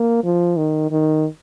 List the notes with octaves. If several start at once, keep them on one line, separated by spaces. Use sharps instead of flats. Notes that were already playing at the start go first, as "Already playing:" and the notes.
Already playing: A#3
F3
D#3
D#3